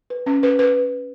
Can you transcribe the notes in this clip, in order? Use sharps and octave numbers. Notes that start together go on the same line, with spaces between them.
B4
C#4
B4
B4